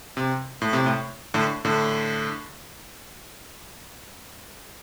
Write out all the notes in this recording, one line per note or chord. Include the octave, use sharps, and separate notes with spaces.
C3
A2
C3
A2
A2 D3
A2 D3